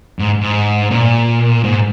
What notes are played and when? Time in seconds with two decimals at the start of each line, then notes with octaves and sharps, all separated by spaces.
0.19 G#2
0.41 G#2
0.91 A#2
1.64 G#2